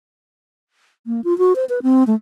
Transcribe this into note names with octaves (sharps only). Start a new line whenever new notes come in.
A#3
F4
F#4
C5
B4
C4
A3